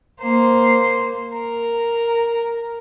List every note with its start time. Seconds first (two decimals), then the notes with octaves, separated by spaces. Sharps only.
0.21 A#3 C5
1.34 A#4